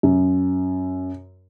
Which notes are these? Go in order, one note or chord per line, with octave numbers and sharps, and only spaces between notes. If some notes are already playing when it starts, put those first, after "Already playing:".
F#2